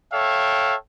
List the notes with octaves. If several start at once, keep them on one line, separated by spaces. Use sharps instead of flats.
A4 C#5 E5 F5 G5